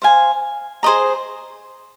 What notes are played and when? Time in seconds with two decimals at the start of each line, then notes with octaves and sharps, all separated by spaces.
0.02 C5 F5 G#5
0.83 G#4 C5 D#5 A#5